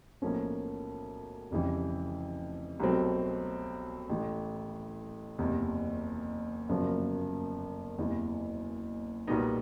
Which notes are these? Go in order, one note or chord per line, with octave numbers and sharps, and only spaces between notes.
B1 A2 F3 A#3 C#4
F1 F2 C#3 E3 G3
C2 B2 F#3 A3 C4
A1 A2 E3 A3
F#1 E2 C3
G1 F#2 C#3 F3 A#3
F#1 E2 C3 E3
B1 A#2 G3 B3 D#4